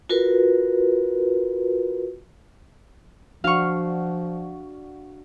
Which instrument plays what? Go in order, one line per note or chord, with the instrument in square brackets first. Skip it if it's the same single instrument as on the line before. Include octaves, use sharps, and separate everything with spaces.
[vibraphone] F4 F#4 A#4 B4
[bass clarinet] F3 [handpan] D4 F#4 [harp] F5 C#6